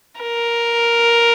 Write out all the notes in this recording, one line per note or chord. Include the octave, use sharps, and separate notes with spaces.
A#4